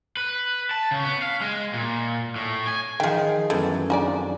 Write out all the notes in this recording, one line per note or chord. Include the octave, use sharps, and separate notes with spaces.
B4
A5
C#3
B3
F5
G#3
A#2
A2
G#5
D#3 F3 F4 G#4 G5
F#2 E3 A3 B3 A4
F2 D4 D#4 G#4 D5